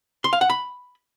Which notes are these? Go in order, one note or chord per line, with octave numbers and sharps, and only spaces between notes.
C6
F5
F#5
B5